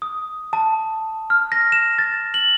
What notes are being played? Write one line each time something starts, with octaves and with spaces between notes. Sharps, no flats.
D#6
A5
F6
A#6
E7
A6
F#7